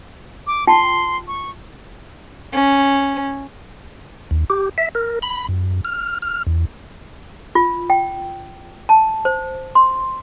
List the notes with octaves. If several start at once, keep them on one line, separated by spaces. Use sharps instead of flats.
D6
F4 G5 A5 C6
C#6
C#4
D#2
G4
E5
A#4
B5
F#2
F6
F6
E2
F4
G5
A5
C5
C6